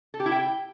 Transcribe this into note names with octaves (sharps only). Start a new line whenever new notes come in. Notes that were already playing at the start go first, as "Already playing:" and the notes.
A4
G4
E4
G5